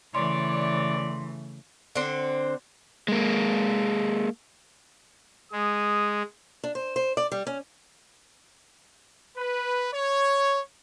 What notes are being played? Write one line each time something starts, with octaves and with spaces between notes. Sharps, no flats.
C#3 E3 A3 C#5 D5 C6
D3 C4
G#3 A#3
G#3 D#6
D4
C5
C5
D5
G3
C#4
B4
C#5